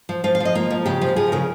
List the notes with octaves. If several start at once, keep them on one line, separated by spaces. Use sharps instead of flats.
F3
F3 F5
F5
F3
D#5
A#3 F4
F3
C#3 G4
F3
F3 G#4
C#3 A#4